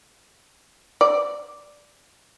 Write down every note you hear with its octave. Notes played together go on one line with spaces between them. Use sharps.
D5